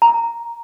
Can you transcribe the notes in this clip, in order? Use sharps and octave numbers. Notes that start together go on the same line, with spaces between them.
A#5